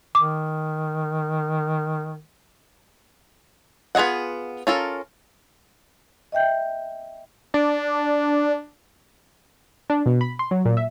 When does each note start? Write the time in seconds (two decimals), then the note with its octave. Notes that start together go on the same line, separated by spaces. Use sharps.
0.15 D#3 D6
3.95 B3 F4 G#4 D#5 F#5
4.67 C#4 F4 A4 A#4
6.32 D#5 E5 G5 G6
7.54 D4
9.90 D4
10.06 B2
10.21 B5
10.39 C6
10.51 F#3
10.65 A#2
10.77 E5